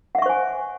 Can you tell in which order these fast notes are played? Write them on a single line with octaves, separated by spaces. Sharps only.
F#5 E5 C#6 C5 G#5